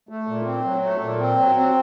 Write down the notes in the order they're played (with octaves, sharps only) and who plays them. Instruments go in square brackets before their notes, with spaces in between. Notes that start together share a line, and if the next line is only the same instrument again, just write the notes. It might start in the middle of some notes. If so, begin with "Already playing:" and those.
[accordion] A3
A#2
C4
F#3
A3
A#2
C4
F#3
C4